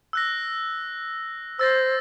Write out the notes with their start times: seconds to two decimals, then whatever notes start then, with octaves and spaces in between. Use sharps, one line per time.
0.13 E6 F#6 A#6
1.59 C5 E6 A6 A#6